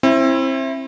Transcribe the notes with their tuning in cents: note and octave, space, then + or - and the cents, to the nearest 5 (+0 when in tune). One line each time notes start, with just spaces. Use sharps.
C4 +30 E4 +5